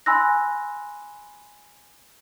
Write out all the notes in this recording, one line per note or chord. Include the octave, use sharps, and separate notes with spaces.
G#5 B5 C6 E6 F#6 A#6